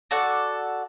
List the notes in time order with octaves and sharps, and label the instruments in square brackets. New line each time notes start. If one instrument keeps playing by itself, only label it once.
[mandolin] F#4 A4 D5 F#5